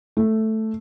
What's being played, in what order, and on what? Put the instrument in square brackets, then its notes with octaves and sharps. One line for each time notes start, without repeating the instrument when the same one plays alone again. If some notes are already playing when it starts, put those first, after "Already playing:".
[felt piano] A3